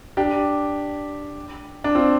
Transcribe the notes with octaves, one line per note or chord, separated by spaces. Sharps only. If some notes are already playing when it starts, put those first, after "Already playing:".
D4 G4
D4
C4 F4